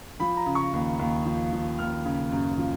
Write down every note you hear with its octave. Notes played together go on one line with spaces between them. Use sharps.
F3 B5
A#5
C#3
C#6
D#2
D#2
F3
F3
D#2 F6
C#3
F#2
F3